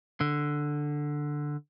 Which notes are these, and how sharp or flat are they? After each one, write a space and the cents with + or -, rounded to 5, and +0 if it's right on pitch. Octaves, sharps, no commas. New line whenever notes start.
D3 +5